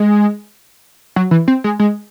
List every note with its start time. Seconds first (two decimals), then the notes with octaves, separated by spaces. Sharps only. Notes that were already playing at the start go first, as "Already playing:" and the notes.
Already playing: G#3
1.16 F#3
1.31 E3
1.48 C4
1.64 G#3
1.80 G#3